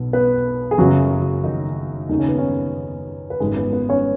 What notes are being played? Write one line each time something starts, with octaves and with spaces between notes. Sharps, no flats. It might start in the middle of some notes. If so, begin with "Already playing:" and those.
Already playing: B1 B2
B3 B4
G#4
F#1 F#2 C#3 F#3 F#4
D#3 D#4
D#2 C#3 D#4
C#4
B3
C#4
B4
G#1 F#2 D#3 G#3 G#4
B3 B4
B3 B4
C#4 C#5